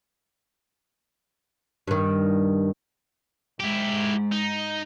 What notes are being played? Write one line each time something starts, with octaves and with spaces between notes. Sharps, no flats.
G2 D#3
G#2 E4 G4
D#4